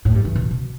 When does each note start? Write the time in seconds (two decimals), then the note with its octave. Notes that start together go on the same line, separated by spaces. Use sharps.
0.05 A2
0.15 G2
0.25 E3
0.35 B2
0.51 B2